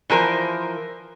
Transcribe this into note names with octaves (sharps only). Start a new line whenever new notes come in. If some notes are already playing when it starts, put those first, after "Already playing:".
E3 F3 A#4 C5